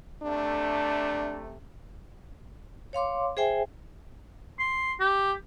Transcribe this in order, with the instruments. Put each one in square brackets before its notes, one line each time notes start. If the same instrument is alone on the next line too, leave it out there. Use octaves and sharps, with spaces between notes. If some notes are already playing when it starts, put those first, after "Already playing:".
[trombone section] C3 A3 [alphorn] D4
[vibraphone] C#5 F5 C6 D6
G#4 C5 E5 G5 G#5
[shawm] C6
G4